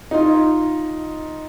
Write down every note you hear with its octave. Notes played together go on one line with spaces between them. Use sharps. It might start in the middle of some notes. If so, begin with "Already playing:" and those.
D#4 F4